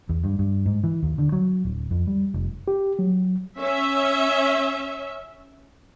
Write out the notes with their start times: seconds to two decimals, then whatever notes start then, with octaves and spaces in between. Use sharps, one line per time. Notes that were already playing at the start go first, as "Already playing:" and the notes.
0.09 E2
0.24 G2
0.39 G2
0.66 G#2
0.84 E3
1.03 D#2
1.18 D3
1.32 F#3
1.64 D1
1.91 F2
2.07 G3
2.34 F1
2.68 G4
2.99 F#3
3.59 C#4 E5